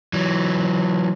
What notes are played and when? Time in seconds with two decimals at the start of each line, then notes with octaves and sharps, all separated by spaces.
0.13 E3 F#3